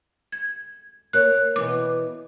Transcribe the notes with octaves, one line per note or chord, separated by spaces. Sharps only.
G#6
A#3 A#4 C#5 F#6
B2 E3 B3 D6